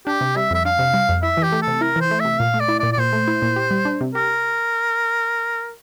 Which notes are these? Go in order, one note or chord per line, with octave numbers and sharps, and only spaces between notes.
D4 G4
C3
G3 E5
F2 E5
D4 F5
C3
G3
F2
E4 E5
E3
G4
A3
A4
C3
E4 A#4
E3 C5
A3
C3 E5
A#2 F5
A3
D5
E4
A#2 D5
D5
A#2 C5
A3
E4
A#2
G4
G3
D4
C3
G4 A#4